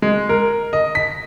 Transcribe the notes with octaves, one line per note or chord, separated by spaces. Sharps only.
G#3
A#4
D#5
B6